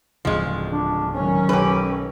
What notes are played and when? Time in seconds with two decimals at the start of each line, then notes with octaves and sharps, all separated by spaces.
0.25 D1 C#2 F3 G#3
0.72 D4
1.13 D#3 F#3 G#3 C#4
1.49 B1 G4 B4